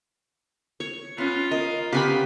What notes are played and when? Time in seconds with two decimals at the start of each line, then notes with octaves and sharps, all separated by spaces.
0.80 C#5
1.18 B3 C#4 F4
1.51 A#4 D#5
1.92 C#3 B3 C4 G4 G#5 B5